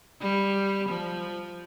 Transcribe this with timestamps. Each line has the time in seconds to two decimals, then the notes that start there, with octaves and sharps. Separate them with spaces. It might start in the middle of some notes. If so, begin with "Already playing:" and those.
0.21 G3
0.88 F3